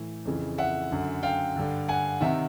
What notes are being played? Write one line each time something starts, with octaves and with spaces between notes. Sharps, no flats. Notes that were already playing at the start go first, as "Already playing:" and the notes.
Already playing: A2 E3
F2 C#3 E3
E5 F#5
F#2 D3
F5 G5
G2 D3
F#5 G#5
C3 D#3 E5 F#5